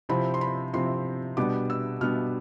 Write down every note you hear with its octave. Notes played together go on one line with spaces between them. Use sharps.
C3 F3 C4 E4 B5
C6
B5
C3 F3 C4 E4 C6
B2 G3 B3 D4 D6
E6
B2 G3 B3 D4 F6